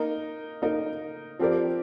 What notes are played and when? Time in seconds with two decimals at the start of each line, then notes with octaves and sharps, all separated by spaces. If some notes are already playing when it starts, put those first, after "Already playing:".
Already playing: A#3 D#4 A#4
0.62 A#3 D#4 A#4
1.39 F3 C4 G4 A#4 D5